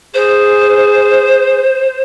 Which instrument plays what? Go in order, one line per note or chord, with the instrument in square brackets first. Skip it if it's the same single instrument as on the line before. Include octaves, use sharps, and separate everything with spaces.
[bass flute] G#4 [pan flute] C5